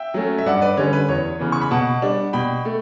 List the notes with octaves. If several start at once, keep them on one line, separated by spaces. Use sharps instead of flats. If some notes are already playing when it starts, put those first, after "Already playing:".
Already playing: E5 G5
F#3 A3 C#4
E5
G2 D5 F#5
B4 D5
D3 G3 C#4 C#5
B4
E2 C#5
C#3 E3 B3
C#6
B5
B2 F#5 A5
G3 D4
B2 G5 B5
A3